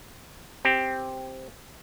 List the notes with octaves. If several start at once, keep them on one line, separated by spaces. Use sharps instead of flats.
C4 G4